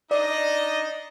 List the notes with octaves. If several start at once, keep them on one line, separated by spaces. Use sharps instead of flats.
D4 D#4 D5 D#5